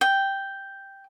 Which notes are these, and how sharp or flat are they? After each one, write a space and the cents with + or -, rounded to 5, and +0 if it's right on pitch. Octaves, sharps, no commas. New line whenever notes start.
G5 +0